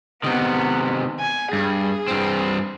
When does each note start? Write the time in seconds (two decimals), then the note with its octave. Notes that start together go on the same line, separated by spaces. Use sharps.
0.24 C3 D#3 B3
1.20 G#5
1.53 G2 G#4
2.08 G2 C4